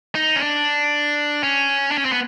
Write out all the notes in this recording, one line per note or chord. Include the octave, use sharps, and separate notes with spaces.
D#4
C#4
D4
C#4
D4
C#4
C4
B3